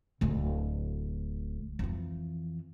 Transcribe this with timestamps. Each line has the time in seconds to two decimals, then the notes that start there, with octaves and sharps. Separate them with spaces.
0.21 D1 D2
1.79 F2 E3